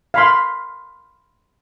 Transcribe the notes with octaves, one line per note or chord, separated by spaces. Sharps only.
F5 B5 C6